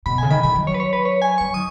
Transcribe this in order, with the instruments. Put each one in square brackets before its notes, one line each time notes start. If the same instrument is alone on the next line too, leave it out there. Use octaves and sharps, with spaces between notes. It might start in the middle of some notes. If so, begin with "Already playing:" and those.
[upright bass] B2 [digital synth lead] B5
[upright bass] C#3 [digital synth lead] G#5
[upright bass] D#3 [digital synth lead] B5
[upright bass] D#3 [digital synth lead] B5
[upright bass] F#3
[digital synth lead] C#5
B4
C#5
B4
C#5
G#5
[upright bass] F#3 [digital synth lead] C#6
[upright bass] D#3 [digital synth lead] D#6